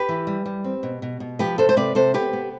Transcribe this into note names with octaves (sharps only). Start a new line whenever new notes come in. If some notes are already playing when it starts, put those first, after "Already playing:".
Already playing: G4 B4
E3
G3
G3
C4
B2
B2
B2
F3 G4 B4
C3 A4 C5
C5
C3 B4 D5
C3 A4 C5
B3 G4 B4
B3